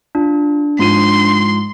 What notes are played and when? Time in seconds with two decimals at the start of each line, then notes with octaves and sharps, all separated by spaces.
0.15 D4 F4
0.79 G#2 F3 C6 D#7